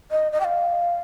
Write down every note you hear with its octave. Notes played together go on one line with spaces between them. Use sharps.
D#5
D#5
G5
F5